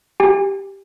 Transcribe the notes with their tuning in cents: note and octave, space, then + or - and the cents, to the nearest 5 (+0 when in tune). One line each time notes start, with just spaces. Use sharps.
G4 +0 G#5 -40